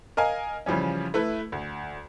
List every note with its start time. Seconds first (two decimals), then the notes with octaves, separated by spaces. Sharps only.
0.17 A#4 D#5 F5 G#5
0.66 C#3 E3 F3 G3 C#4
1.14 A3 E4 B4
1.52 D2